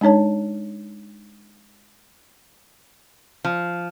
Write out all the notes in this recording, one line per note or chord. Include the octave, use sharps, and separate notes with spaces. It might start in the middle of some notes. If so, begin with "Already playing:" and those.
G#3 D4 D#4 C#5 A5
F3